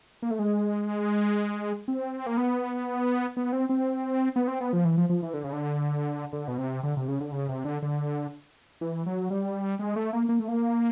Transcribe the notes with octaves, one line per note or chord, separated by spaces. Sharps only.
A#3
A3
G#3
C4
A#3
B3
B3
C4
C4
B3
C4
B3
F3
E3
F3
F3
E3
D3
C#3
D3
D3
B2
C3
D3
C3
C#3
D3
C#3
C3
D3
D3
E3
F#3
G3
G#3
A3
A#3
A#3
A3
A#3